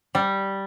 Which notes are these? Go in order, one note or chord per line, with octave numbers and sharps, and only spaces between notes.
G3